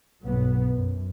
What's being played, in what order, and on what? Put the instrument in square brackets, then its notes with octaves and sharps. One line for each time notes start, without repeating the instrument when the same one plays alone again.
[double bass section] B1 G2 F#3 B3
F#2